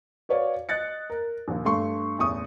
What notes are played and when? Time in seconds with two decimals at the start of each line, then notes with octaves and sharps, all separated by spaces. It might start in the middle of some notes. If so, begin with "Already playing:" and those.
0.29 F#4 B4 C#5 D5 F5
0.69 D#5 F#6 A6 C#7
1.10 A#4
1.48 A#1 D#2
1.65 G2 A3 C6 C#6
2.19 A1 E2 C#6 D#6